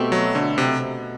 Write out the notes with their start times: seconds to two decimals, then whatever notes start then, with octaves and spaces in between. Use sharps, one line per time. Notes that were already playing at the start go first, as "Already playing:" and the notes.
Already playing: B2 A3 C4 G4
0.12 F#3
0.35 D3
0.58 C3